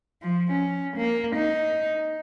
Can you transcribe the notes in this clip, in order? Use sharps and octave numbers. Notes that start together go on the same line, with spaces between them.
F3
C#4
A#3
D#4